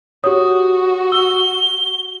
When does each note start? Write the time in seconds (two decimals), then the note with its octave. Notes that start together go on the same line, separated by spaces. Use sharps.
0.24 F#4 G4 C#5 D#6
1.12 E6 G7